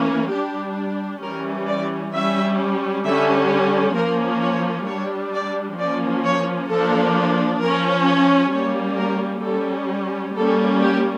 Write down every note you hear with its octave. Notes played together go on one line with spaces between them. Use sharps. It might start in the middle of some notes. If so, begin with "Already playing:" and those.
Already playing: E3 A#3 C#4
G3 D4 G4
E3 G3 C#4 A#4
D5
G3 C#4 E5
D3 G3 C#4 E5
F3 A#3 C#4 A#4
C#5
G3 D4 C#5
D5
F3 A#3 C#4 D5
C#5
F3 A#3 D4 A4
F3 C#4 A#4
C#5
G3 A#3 C#4 C#5
A#4
G3 C#4 A4
G3 A#3 C#4 A4
G4